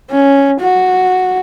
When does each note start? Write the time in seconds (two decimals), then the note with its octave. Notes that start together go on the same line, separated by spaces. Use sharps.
0.11 C#4
0.60 F#4